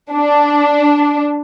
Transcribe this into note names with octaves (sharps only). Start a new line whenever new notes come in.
D4